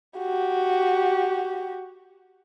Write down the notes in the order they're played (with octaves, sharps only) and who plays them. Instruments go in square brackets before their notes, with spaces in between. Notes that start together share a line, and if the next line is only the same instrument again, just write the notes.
[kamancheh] F#4 G4